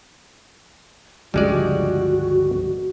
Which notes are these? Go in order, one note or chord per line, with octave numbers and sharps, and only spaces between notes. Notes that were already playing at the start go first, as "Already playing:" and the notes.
G1 C#2 F3 G3 G#3 F#4 D5